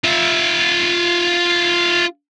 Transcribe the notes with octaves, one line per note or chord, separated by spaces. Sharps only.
F4 E5